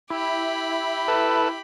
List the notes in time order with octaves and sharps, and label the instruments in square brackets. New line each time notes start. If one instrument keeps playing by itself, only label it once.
[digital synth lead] E4 [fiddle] G4 B5
[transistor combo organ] A4 B4